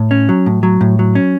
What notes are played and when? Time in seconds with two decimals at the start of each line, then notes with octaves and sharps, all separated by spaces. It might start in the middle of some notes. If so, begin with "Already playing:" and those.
Already playing: A2
0.11 C#4
0.29 F#3
0.46 A2
0.63 F#3
0.81 A2
0.99 F#3
1.15 C#4